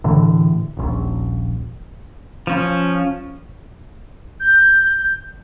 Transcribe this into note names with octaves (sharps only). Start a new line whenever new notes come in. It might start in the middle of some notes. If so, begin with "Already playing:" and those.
A2 D3 E3
D#1 A#1
F3 C#4
G6